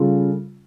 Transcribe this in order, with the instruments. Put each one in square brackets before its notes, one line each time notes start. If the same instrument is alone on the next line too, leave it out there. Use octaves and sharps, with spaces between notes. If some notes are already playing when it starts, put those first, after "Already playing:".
Already playing: [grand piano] C#3 G3 C#4 F4 A4